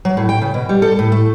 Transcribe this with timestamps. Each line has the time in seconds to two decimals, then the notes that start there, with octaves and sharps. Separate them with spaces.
0.05 F#3
0.17 A2
0.29 G5
0.42 C#3
0.54 B2
0.69 G3
0.82 A4
0.99 A2
1.12 A3